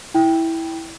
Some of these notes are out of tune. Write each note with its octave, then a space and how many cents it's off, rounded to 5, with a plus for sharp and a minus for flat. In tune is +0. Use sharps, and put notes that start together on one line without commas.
E4 -10 G5 +0